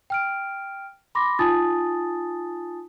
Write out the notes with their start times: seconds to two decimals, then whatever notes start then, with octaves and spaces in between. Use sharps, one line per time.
0.10 G5 F6 D7
1.15 B5 C6 D6 A#6
1.39 D#4 F4 G#5 A5 D#6 A6